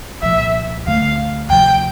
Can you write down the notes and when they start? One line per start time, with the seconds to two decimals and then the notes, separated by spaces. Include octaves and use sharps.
0.22 C2 A#2 F3 E5
0.87 D2 D3 A3 F5
1.50 D2 C3 F3 G5